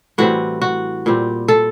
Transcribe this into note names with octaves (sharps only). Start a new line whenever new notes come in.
A2 E3 G3 C4 F#4
F#4
A#2 G3 C4
A4